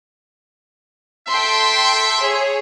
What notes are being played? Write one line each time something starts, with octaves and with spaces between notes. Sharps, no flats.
A4 E5 G5 C6
G#4 C#5